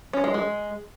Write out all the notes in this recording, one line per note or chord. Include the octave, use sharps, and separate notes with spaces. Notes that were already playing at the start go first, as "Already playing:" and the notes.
C#4
G#3
G#3